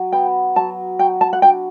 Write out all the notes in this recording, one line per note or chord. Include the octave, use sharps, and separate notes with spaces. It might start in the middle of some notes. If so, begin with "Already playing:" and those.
Already playing: F#3
B3 G5
F#3 A5
F#3 G5
A5
F#5
D4 G5